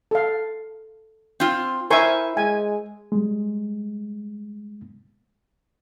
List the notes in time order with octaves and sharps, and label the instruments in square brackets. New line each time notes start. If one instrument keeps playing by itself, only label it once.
[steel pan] A4 F5
[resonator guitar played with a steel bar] C4 F4
[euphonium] E4 [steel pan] A#4 G#5 C#6 [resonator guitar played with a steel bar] C5 E5
[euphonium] G#3 [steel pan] G#5
[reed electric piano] G3 G#3